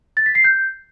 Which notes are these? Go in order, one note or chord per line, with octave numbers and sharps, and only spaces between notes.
A6
B6
C7
G6